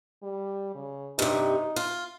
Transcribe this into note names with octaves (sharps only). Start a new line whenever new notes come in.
G3
C#3
G2 C3 D#4
F4